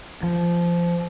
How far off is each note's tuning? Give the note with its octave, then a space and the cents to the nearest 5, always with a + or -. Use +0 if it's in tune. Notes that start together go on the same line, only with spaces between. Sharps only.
F3 -15